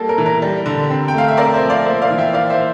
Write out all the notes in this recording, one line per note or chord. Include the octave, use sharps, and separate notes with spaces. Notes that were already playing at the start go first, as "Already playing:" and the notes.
Already playing: G3 A#3 A4
A#4
E3
A#4
G3
D3
C4
G5
A3 F5
E5
C4 A#4 D5
C5 E5
F3
D5 F5
A#3 C5 E5
D5 F5
E3
E5 G5
A#3 D5 F5
C5 E5